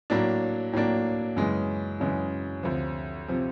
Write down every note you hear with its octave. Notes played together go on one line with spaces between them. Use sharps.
A2 F#3 A#3 D4
A2 F#3 A#3 D4
F#2 C#3 E3 G#3
F#2 C#3 E3 G#3
D2 C3 F3
C3 F3